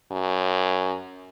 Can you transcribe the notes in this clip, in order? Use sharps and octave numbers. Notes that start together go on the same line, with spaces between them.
F#2